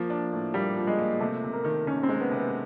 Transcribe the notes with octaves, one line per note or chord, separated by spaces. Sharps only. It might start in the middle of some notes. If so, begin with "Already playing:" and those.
Already playing: F3 A#3
D4
A2
G3 A#3
F3
G#3
A#3
C3 A3
C3
A#3
D#3
D#3 C#4
C4
G#3
B3
C3
B3